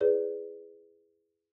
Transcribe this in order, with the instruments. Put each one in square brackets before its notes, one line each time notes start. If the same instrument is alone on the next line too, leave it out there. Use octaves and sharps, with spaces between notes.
[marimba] E4 G#4 B4 C#5 D5